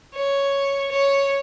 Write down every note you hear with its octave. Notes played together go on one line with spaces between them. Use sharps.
C#5
C#5